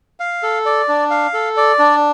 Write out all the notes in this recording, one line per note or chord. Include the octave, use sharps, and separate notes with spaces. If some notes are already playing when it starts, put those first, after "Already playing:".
F5
A4
D5
D4
F5
A4
D5
D4